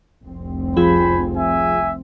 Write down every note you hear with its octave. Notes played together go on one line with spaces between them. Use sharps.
F1 C2 C4
F3 F4 G#4 C5 G#5 B5
E5 G#5